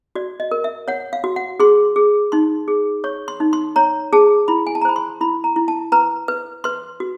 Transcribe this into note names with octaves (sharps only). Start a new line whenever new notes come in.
F#4 D5
D#5
A#4
E5
C#5 F#5
F5
F#4
F#5
G#4 C6
G#4
D#4 C6
G#4
C#5 C#6
C6
D#4
C6
C#5 A#5
G#4 A5
E4 B5
G#5
A5
A#5
C5 B5
C6
E4 B5
A#5
E4
A5
B4 A#5
B4
B4 C6
F#4